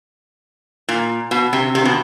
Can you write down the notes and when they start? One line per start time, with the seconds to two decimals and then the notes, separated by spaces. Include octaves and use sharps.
0.89 A#2
1.31 B2
1.53 C3
1.75 C3
1.85 B2